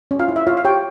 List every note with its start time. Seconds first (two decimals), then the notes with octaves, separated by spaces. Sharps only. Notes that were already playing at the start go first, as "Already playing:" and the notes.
0.11 C#4
0.19 F4 F5
0.28 E4
0.36 E5
0.47 F4 C#5 F5
0.57 F5
0.64 G4 C#5 G5